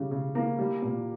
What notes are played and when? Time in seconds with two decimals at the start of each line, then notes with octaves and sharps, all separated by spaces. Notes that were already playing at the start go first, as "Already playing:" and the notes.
Already playing: C#3 G3
0.11 C#3
0.35 A#3
0.58 G3
0.82 A#2